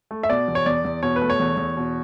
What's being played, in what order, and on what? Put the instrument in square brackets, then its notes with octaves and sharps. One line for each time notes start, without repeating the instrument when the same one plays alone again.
[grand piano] A3
E5
B2 D5
E2
C#5
E2 D5
E2
B2 C#5
B4
A3
C#5
E2
E2
B2